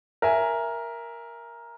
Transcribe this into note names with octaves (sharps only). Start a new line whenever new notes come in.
A#4 E5 G#5